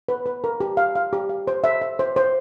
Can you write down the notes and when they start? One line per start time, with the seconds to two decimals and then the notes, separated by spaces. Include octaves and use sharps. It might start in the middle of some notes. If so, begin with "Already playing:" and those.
0.08 B4
0.26 B4
0.44 A#4
0.60 G4
0.77 F5
0.95 F5
1.13 G4
1.29 F5
1.47 C5
1.64 E5
1.82 E5
1.99 C5
2.16 C5